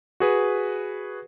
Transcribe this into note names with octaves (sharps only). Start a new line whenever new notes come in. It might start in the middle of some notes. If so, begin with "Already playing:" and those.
F#4 G#4 B4